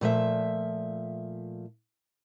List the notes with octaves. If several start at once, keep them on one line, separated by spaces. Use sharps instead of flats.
A#2 F3 A3 E5